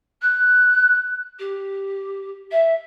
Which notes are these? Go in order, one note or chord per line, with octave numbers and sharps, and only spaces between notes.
F#6
G4
E5